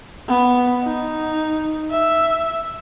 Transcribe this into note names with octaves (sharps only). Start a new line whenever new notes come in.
B3
D#4
E5